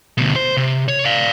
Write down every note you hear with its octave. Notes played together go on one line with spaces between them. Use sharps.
D2 B2
C5
C3
C#5
D5 F5